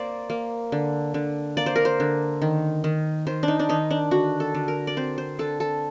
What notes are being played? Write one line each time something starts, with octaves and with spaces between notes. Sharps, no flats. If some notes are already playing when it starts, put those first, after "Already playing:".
Already playing: A#3 C5 D5
A#3
D3
D3
A#3 D5
C5
A#4
C5
D3
D#3
D#3
D#3 C5
D4
D#4
D4
D#3 D#4
D4
D3 F#4
A4
D3
A#4
D5
C4 C5
C5
D3 A4
A4